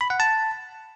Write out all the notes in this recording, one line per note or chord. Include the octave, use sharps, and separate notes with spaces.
B5
F#5
A5